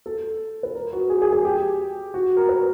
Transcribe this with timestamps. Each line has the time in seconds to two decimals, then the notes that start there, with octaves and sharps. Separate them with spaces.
0.06 A4
0.63 B4
0.75 A#4
0.93 F#4
1.10 G#4
1.22 G#4
1.33 G#4
1.45 G4
2.14 F#4
2.37 A#4
2.49 B4